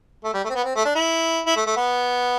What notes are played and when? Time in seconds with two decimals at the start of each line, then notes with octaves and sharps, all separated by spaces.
0.24 A3
0.34 G3
0.44 A3
0.49 C4
0.55 B3
0.64 C4
0.76 A3
0.85 D4
0.95 E4
1.46 E4
1.56 A3
1.67 A3
1.76 B3